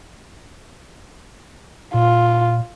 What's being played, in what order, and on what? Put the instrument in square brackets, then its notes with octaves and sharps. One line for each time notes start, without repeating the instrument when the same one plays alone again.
[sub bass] A#2 [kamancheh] F4